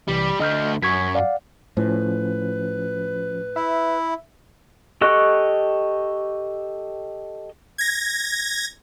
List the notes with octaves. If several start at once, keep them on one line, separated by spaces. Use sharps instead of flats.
B1 C3 E3 G3
D3 A3 D#5 F6 G6
F#2 C#6 G#6 B6
D5 F5 F#5
A2 F3 C#4 B4
E4 E5
G4 A4 D#5 C#6 F#6
G#6 A#6